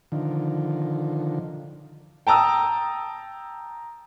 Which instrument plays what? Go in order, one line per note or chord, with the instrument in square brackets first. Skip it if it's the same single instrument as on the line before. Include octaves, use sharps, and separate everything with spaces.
[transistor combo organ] D3 D#3 F3
[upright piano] G5 A5 A#5 D#6 E6